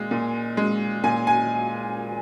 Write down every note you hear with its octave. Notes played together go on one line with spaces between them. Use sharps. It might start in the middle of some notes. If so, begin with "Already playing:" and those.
Already playing: A#2 G#3
A#2
G#3
A#2 G#5
G#5